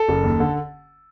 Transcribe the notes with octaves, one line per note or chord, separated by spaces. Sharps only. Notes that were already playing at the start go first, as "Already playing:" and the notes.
Already playing: A4
F#1
D#2
D3